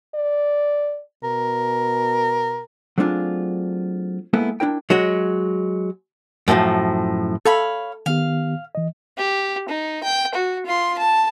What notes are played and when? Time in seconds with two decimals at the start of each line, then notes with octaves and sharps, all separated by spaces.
0.15 D5
1.24 B2 A#4
2.98 F#3 A3 C4 D4 F4 G#4
4.33 G#3 A#3 B3 E4 A4 B4
4.60 D4 E4 A#4 G5
4.90 F#3 G#3 F#4
6.48 F#2 A2 D3 F3
7.46 A4 C#5 F5 B5
8.06 D#3 B3 G4 F5
8.75 E3 D#5
9.17 G4
9.69 D#4
10.03 G5
10.34 F#4
10.66 F4 C6
10.98 A5